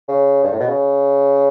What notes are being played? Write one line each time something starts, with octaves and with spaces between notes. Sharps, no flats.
C#3
G2
A2
B2
C#3